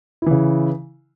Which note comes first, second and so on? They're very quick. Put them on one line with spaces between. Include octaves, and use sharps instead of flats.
E4 E3 C#3